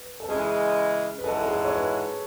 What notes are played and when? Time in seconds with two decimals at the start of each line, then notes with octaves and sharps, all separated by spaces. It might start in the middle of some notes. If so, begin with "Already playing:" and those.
Already playing: B4
0.20 A4
0.28 C#3 E3 G#3 G#4
1.18 B4
1.24 G#2 E3 G#3 C#4 F#4 A4
1.41 A4
1.48 G#4
1.65 C#5
1.73 B4